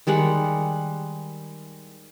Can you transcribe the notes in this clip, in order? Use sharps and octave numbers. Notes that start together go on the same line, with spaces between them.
D#3 G3 G#3 F#5